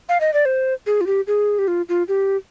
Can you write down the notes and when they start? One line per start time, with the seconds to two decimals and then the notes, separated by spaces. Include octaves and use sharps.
0.09 F5
0.21 D#5
0.34 D5
0.45 C5
0.86 G#4
1.01 F4
1.07 G4
1.27 G#4
1.59 G4
1.68 F4
1.89 F4
2.08 G4